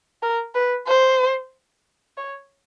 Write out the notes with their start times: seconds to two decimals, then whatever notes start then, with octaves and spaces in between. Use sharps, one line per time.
0.23 A#4
0.55 B4
0.88 C5
2.17 C#5